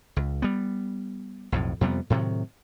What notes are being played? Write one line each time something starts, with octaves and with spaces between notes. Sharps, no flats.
C#2
G3 B3
B1 F2 A2
F2 C3 G3 B3
A2 C3 D#3 F#3